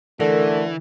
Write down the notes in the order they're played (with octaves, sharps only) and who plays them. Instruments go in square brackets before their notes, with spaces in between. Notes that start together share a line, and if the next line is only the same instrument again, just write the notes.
[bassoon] D3 [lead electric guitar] E3 [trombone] A3 [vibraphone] A#4